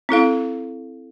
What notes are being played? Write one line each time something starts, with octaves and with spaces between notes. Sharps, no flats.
C4 E4 A4 F5